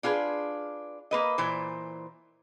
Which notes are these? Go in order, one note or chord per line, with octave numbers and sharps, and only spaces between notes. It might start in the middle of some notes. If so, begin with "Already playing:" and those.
D4 F4 G#4 B4
A#3 B4 D#5
A#2 E3 C5